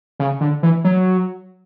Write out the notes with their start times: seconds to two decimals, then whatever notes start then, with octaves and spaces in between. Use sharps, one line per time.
0.20 C#3
0.41 D3
0.63 E3
0.84 F#3